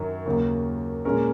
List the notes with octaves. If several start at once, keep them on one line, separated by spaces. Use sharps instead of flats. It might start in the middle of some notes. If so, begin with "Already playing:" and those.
Already playing: F#2 D#3 F#3
D#2 C#3 F#3 A#3
A#2 G#3 C#4 A#4 C#5